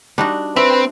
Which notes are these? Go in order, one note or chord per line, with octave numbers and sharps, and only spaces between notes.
G3 D4 D#4 F#4
C4 B4 E5